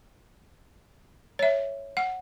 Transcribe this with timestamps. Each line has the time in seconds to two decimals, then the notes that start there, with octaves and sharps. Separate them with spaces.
1.39 C#5 E5
1.97 F#5